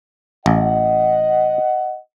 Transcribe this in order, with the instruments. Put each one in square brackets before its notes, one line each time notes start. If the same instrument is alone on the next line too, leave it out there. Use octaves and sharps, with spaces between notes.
[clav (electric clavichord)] A1 [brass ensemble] D#5 F#5